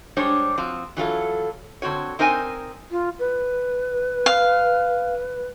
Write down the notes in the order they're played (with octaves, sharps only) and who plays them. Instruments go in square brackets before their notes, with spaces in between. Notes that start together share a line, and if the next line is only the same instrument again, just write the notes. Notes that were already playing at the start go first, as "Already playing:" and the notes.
[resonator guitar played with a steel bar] G3 G#3 D4 C5 C#5
F3 C4 F#4
E3 F#3 F4 A4
D3 C4 F#4 C#5
C4 D#4 A#4 C5 F5 G#5
[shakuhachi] F4
B4
[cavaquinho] F5